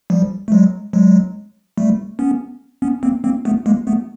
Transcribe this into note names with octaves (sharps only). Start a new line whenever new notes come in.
F3 G3
A3
F#3 G#3
F#3 G#3
G3 A3
B3 C#4
B3 C#4
A#3 C4
A#3 C4
A3 B3
G#3 A#3
A3 B3